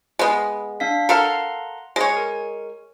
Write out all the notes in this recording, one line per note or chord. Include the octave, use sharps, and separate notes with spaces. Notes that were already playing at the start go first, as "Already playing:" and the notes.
G#3 B3
D4 F5 B6
A4 A#4 F5 F#5 A#5 C6
G#3 C#5
A#4